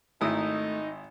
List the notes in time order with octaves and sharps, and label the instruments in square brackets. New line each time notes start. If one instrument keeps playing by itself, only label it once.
[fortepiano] G#1 E4 D#6 [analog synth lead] A3 [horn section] D#4